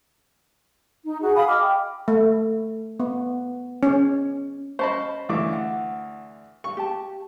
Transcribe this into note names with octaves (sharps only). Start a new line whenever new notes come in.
D#4
F#4 G#4
F5 G#5 B5 D#6
D#5 D6 F6
G5
A3
B3
C#4
C#4 C5 D#5 A5 B5
D2 E3 D6
F#5
C#6
G4 A5